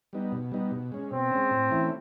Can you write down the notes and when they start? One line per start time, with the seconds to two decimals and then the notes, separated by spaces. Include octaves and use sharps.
0.13 G3 B3 D#4
0.32 B2
0.52 G3 B3 D#4
0.71 B2
0.92 G#3 C#4
1.11 B2 C4
1.31 G#3 C#4
1.50 A2
1.70 E3 A3 C#4 E4